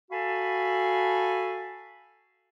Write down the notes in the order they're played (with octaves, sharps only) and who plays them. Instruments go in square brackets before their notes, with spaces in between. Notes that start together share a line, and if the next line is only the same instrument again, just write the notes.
[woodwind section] F#4 A4 F5 G#5 A5 B5